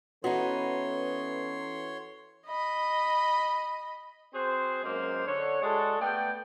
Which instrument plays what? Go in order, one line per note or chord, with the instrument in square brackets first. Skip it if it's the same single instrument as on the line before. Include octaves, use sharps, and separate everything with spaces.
[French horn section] E3 C#4 A4 [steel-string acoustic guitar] B3 D#4 [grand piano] F#4 [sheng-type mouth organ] C#5 C6
[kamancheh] D#5 B5
[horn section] C4 F#4 G#4 C5
F#2 G#3 A#3 C5
D3 C#5
G#3 D4 F#4 G#4 A4
A3 B3 D5 G5